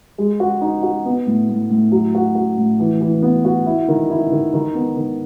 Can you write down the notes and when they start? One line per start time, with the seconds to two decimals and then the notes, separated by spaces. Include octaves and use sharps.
0.18 G#3
0.40 F#4
0.61 D#4
0.83 F#4
1.05 B3
1.27 A2
1.49 A2
1.70 A2
1.92 F#3
2.15 F#4
2.35 F#4
2.57 A2
2.79 E3
3.01 E3
3.22 B3
3.45 F#4
3.66 E4
3.88 D#3
4.10 E4
4.32 D#3
4.53 D#3
4.75 B3
4.97 D#3